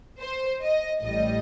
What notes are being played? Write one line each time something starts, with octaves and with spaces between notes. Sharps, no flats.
C5
D#5
A1 A2 G3 D#5